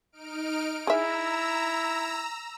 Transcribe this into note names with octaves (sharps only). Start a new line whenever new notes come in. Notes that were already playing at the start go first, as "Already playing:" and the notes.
D#4 F6 D7
E4 G#4 E5 A#5 E6